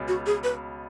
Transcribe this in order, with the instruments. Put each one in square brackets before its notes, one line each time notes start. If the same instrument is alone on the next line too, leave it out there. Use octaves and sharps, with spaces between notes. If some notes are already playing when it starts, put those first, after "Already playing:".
Already playing: [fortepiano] C#2 B2 G#3
[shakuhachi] F#4
G#4
B4